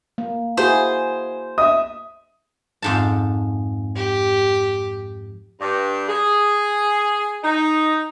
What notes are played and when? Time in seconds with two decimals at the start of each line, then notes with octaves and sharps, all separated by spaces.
0.18 A#3
0.57 E4 F#4 G#4 C5
1.58 D#5 E5 D#6
2.82 F2 G#2 A5
3.96 G4
5.60 G2
6.08 G#4
7.44 D#4